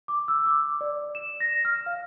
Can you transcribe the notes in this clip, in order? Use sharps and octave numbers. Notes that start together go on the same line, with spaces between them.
D6
E6
D6
D5
E7
A#6
F6
F5